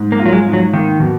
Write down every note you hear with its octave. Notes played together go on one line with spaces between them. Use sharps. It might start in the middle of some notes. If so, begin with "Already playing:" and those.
Already playing: G#2
A#3
F4
F#3
G#3
G#2
F#3
D#3 A#3
B2